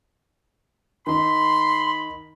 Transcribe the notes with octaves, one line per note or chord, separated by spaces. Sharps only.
D#3 D#4 B5 C6